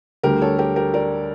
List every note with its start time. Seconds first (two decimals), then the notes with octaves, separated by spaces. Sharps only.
0.23 D2 D3 G3 G4 A#4
0.41 A4 C#5
0.58 G4 A#4
0.76 G4 A#4
0.94 A#4 D5